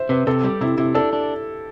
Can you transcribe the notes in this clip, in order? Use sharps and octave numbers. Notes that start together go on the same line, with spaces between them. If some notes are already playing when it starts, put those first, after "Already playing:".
Already playing: C5 E5
C3 B4
C3 A4
G3 G4
C3 E4
C3 E4
D4 A4
D4